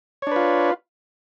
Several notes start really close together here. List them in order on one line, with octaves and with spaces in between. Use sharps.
C#5 D4 B4 F4